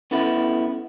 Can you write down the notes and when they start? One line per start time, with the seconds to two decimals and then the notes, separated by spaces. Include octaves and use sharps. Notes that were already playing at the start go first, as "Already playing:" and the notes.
0.11 B3 C#4 D4 E4 A4